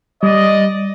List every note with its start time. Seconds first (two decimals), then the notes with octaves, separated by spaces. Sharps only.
0.23 G3 D5 D#5